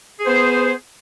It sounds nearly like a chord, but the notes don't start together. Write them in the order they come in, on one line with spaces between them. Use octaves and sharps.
G#4 C5 B3